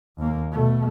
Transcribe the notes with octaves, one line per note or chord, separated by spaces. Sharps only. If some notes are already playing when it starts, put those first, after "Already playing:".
D#2 A#3
B2 A3